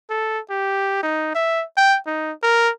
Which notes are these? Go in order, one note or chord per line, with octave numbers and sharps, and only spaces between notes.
A4
G4
D#4
E5
G5
D#4
A#4